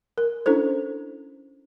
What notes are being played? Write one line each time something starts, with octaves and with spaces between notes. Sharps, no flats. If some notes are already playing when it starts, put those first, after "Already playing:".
A#4
C#4 D4 E4 A4 C5